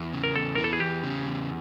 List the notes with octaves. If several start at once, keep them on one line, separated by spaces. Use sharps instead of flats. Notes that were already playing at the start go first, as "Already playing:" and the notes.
Already playing: E2
C#3
A#4
E2 A4
E3 A#4
A4
G#4
E2 G4
C#3
E2